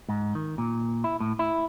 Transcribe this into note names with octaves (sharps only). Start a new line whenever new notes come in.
G#2
D#3
A#2
E4
A2
E4